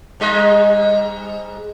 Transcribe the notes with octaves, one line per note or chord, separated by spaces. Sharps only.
G#2 G3 D#5